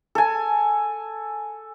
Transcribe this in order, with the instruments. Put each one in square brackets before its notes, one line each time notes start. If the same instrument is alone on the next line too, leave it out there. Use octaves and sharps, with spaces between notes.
[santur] A4 G#5